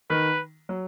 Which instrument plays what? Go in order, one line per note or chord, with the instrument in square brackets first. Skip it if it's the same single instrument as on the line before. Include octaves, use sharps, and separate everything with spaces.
[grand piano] D#3 [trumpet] B4
[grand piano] F#3